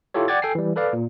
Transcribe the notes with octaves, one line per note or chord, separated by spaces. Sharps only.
E4 F4 G4 A4 C#5
D5 F#5 G5 D6 G#6 A6
A4 G5 G#5 C7
E3 G3
A4 B4 D5 F5
A#2